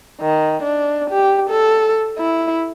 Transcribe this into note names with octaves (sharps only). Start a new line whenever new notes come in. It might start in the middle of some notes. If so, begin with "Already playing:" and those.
D#3
D4
G4
A4
E4